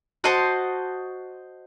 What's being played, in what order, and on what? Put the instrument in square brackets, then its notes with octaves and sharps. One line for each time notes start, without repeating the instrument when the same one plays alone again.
[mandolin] F#4 C5 D#5 A5